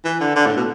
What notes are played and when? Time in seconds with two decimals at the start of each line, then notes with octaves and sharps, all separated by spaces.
0.05 E3
0.20 D3
0.36 D3
0.46 A2
0.57 B2